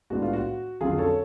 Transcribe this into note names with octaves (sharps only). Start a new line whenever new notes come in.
A2 G#3 B3 D4 F#4
F4
F#4
F2 D3 F#3 C#4 F4 G#4
A4 C#5